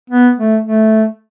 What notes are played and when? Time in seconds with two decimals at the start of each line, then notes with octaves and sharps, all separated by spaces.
0.10 B3
0.37 A3
0.64 A3